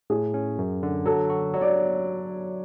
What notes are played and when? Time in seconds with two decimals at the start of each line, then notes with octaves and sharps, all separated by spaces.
0.10 A2 G#4
0.34 C#4
0.58 F#2
0.83 D3
1.05 F#3 A4
1.30 F#4
1.54 F#3 C#5
1.61 D5